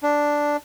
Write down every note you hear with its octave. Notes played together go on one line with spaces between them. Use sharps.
D4